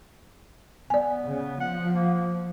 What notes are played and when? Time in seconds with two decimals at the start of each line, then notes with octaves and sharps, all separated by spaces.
0.90 B3 D5 G#5
1.24 C#3
1.60 F3 F#5
1.95 A#3